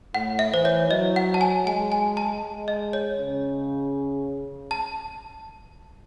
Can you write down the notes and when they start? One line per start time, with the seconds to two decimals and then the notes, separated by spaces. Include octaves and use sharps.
0.14 A2 F#5
0.39 E5
0.52 E3 C5
0.65 C#5
0.90 F#3 D#5
1.16 F#5
1.34 A5
1.41 G#5
1.66 G#3 G#5
1.92 G#5
2.17 A5
2.43 G#3
2.68 D#5
2.93 C#5
3.19 C#3
4.71 A5